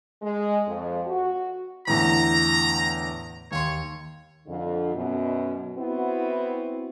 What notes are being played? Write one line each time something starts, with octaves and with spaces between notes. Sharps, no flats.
G#3
F2
F#4
E2 A2 D3 A#5
D#2 C#5 C6
F2 D3
F#2 B2
B3 C4 E4 F#4